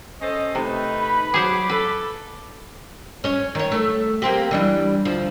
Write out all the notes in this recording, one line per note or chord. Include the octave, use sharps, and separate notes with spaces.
C#4 A4 C5 D#5
C3 A3 D#4 B4
B5
F#3 G#4 C5 F#5 D6
A4 B4
C#4 C#5
D#3 C#5
A3
A#3 C4 G4
E3 G3 D4
D2 F3